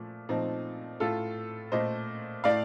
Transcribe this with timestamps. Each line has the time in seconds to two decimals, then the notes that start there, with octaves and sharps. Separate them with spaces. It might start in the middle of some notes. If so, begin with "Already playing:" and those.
Already playing: A#2 F3 A3
0.29 A#2 F3 A3 C4 D#4
1.00 A2 A3 F4 A4
1.72 A#2 A3 C5 D#5
2.44 A2 A3 D5 F5